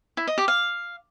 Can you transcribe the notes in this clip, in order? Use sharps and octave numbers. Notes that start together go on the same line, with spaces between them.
E4
D#5
G4
F5